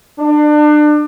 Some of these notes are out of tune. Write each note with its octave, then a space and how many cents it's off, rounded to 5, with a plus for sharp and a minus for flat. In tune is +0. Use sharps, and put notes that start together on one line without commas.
D4 +30